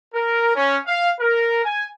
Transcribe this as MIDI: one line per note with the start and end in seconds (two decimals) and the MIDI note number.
0.14 0.54 70
0.55 0.77 61
0.86 1.09 77
1.20 1.64 70
1.64 1.85 80